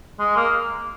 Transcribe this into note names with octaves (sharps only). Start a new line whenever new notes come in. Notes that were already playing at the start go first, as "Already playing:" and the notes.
G#3
A#3